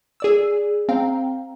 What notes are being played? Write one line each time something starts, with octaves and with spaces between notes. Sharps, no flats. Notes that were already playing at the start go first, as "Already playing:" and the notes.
G#4 D5 E6
C4 F5 G5 A#5